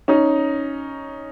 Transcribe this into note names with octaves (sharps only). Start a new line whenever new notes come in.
C#4 D#4